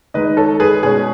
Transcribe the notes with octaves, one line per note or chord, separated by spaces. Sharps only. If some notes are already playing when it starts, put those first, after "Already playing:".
D#3 G#3 D#4 B4 D#5
A4 C#5
G#4 B4
B2 G#3 C#4 G#4